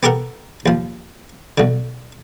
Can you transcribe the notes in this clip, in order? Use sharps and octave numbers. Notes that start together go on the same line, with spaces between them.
B3 G4 A4 A#4 F#5
D#2 F3
B1 D3